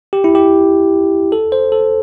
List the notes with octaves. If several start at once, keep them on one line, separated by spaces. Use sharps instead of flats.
G4
E4
G4
A4
C5
A4